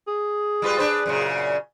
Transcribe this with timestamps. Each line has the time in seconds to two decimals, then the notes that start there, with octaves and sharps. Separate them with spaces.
0.08 G#4
0.62 G3 F4 B4
0.78 D4 B4 C5
1.06 F#2 A#2 C#3